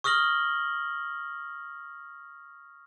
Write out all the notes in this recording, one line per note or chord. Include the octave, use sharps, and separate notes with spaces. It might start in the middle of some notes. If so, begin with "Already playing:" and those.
C#6 D#6 F6 A#6 F#7 G7